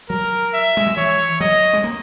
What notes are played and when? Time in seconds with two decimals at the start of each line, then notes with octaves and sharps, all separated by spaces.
0.09 F#3 A#4
0.54 E5
0.77 G#3
0.87 F#3
0.96 E3 C#5
1.40 F#3 D#5
1.73 G#3
1.84 A#3